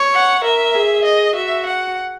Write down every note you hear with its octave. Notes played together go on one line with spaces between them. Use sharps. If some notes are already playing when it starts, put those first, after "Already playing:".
Already playing: C#5
F#5
A#4 E5
G#4
D#5
F#4 E5
F#5